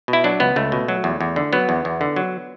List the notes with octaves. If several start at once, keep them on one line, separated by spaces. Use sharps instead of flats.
B2
E4
F#3 D4
C#2 B3
C#2 A3
B2
F#3
E2
E2
D3
F#3 B3
E2
E2
D3
F#3